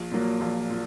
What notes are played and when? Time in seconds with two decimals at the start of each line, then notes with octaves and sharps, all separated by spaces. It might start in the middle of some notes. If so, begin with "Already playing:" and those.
Already playing: A#1
0.11 A#2 F#3 A#3
0.41 A#1
0.70 A#2